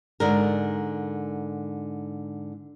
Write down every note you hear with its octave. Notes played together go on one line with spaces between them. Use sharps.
G#2 D3 A#4